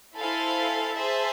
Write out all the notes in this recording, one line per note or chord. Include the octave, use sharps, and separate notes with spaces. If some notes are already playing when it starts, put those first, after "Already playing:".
E4 A4 C5 F5 G#5
G#4 C5 E5 A5